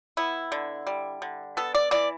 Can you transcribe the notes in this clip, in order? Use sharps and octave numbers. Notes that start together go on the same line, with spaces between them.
B3 E4
D3
G3
D3
B3 A4
D5
E3 D5